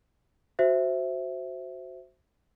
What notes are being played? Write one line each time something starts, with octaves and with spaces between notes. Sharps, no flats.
F#4 C5 E5